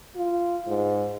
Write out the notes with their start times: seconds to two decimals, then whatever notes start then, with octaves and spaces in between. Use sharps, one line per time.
0.16 F4
0.68 G#2